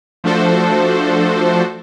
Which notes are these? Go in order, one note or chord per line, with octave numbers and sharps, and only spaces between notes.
F3 A3 D4 F#4 A4 C5